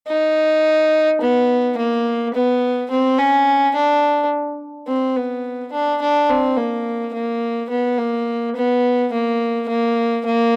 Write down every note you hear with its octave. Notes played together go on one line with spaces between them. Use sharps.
D#4
B3
A#3
B3
C4
C#4
D4
C4
B3
D4
D4
C4
A#3
A#3
B3
A#3
B3
A#3
A#3
A#3